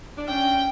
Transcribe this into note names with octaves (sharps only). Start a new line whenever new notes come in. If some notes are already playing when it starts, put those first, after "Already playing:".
D4
C#4 G5